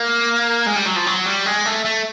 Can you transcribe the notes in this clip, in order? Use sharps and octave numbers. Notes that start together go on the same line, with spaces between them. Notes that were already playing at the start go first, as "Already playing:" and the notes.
Already playing: A#3
G#3
G3
F#3
F3
F#3
G3
G#3
A3
A3